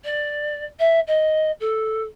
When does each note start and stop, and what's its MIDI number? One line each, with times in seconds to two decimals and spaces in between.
0.04 0.65 74
0.79 1.00 76
1.07 1.51 75
1.60 2.02 69